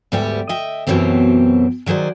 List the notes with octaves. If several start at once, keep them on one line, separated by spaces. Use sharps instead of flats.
D2 G#2 G3 B3 G4 E5
D#5 E5 G5
F#2 B2 E3 F#3 C4 G4
D#3 F#3 G#4 C5 D5